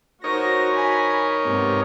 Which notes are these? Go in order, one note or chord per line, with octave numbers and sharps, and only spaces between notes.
D#4 F#4 A#4 C5 C#5 A#6
G#5 B5
G#2 C3 B3